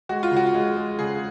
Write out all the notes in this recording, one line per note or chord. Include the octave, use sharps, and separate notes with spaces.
G#3 F#4
F4
C#3
F#4
G#3
G#3
C#3 G#4